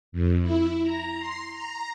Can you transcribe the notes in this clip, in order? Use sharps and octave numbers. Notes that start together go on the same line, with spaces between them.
F2
E4
A#5
C6
A#5